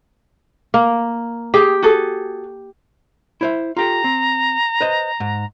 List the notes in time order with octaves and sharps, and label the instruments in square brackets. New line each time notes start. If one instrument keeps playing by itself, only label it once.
[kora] A#3
[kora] G4 [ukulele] G#4 G5
[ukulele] F#4 G#4 A4
[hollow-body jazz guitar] E4 C5 E5
[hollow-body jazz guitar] F4 G4 A4 [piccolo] A#5
[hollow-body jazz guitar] C4
B4 C5 D#5
G#2